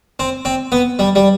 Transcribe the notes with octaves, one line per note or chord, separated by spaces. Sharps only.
C4
C4
B3
G3
G3